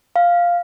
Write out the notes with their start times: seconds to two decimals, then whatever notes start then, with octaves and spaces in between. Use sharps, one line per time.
0.16 F5